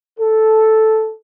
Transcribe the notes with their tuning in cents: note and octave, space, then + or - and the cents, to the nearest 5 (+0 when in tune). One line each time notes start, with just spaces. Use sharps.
A4 -5